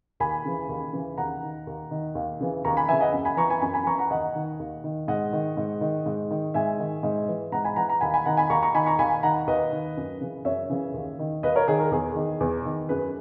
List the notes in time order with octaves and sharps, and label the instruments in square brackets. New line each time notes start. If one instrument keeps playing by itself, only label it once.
[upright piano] D#2 G#5 B5
C#3 E3
D#2
C#3 E3
D#2 F#5 A#5
D#3
D#2
D#3
D#2
C#3 E3
D#2 A#5 C#6
G#5 B5
C#3 E3 E5 G#5
D#5 F#5
F#2
G#5 B5
E3 A#5 C#6
G#5 B5
F#2 G#5 B5
G#5 B5
E3 A#5 C#6
F#5 A#5
D#2 D#5 F#5
D#3
D#2
D#3
G#2 D#5 F#5
D#3
G#2
D#3
G#2
D#3
G#2 E5 G#5
D#3
G#2
E3
G#2 F#5 A#5
G#5 B5
E3 F#5 A#5
F#5 A#5
D#2 G#5 B5
G#5 B5
D#3 F#5 A#5
G#5 B5
D#2 A#5 C#6
A#5 C#6
D#3 G#5 B5
A#5 C#6
D#2 G#5 B5
D#3 F#5 A#5
D#2 B4 D#5
D#3
F#2
C#3 E3
F#2 C#5 E5
C#3 E3
D#2
D#3
D#2 B4 D#5
A#4 C#5
D#3 G#4
A#4
E2 G#4
D#3
E2
D#3
F#2 G#4 B4